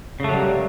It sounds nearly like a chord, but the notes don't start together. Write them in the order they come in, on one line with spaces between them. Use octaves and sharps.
C#3 A3 F#3 G3 A#3